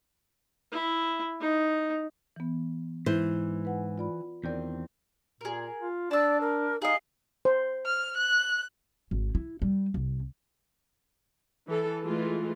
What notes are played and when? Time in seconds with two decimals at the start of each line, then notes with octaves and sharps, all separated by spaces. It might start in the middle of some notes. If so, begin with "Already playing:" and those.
0.72 E4
1.41 D#4
2.36 E3 B3
3.06 G#2 E3 C5 G6
3.65 B4 F#5 G#5
3.98 F4 D5 B5
4.44 E2 D#3 C4 A#4 D5 G6
5.41 A#2 G#4 A#4
5.80 F4
6.11 D4 D5 A5 E6
6.40 A#4
6.82 D#4 G#4 D#5 F5
7.45 C5
7.86 F6
8.17 F#6
9.11 G#1
9.35 E4
9.62 G3
9.94 C2
11.66 E3 A4
12.03 E3 G#3 A3 F4